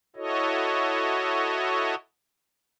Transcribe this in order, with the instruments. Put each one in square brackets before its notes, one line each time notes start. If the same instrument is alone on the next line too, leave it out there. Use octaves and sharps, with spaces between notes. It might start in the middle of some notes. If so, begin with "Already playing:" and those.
[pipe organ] E4 F#4 A4 C#5 D#5